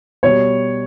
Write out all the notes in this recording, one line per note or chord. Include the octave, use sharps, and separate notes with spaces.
B2 G3 C#5